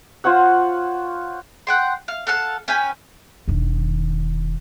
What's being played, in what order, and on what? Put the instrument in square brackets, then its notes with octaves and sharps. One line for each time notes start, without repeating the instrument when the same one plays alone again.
[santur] F4 C5 C#5 F#5
[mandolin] F#5 G5 C6
F5
A4 F5 F#5 A5
C#4 B4 G5 G#5
[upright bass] E1 D#3